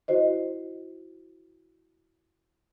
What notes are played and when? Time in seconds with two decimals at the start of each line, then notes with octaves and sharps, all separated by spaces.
0.08 E4 F#4 C5 D#5